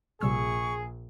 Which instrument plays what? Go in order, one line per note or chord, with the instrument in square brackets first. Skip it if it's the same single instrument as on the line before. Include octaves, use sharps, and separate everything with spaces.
[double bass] A#1 [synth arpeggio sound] C3 G3 E6 [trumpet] G#4 [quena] C#6